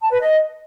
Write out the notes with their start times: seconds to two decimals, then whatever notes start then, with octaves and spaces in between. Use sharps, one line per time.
0.01 A5
0.11 B4
0.20 D#5